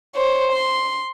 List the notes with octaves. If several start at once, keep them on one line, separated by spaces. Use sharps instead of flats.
C5 C#5
C6